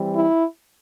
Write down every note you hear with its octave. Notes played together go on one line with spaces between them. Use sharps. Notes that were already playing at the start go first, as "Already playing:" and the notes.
Already playing: E3 G3 C4
E4